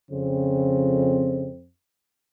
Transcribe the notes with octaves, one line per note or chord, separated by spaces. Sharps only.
F2 C#3 C4